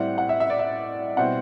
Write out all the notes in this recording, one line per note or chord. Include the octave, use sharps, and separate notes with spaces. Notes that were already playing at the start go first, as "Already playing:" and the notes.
Already playing: A2 G3 C4 E4 F#5
F#5
E5
E5
D5
E5
B2 G3 C4 E4 F#5